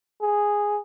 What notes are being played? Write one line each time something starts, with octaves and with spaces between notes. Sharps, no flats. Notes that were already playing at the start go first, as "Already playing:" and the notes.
G#4